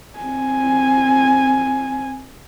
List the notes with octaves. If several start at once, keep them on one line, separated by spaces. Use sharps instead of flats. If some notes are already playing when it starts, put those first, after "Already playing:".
C4 G#5